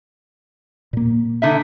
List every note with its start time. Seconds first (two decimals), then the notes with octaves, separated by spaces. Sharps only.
0.93 A#2 A#3
1.42 D3 D#4 E5